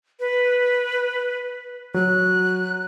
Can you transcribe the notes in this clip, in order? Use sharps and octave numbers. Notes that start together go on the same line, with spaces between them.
B4
F#3 F#6